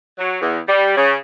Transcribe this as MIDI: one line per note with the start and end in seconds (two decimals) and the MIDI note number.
0.19 0.37 54
0.41 0.58 40
0.67 0.95 55
0.96 1.14 49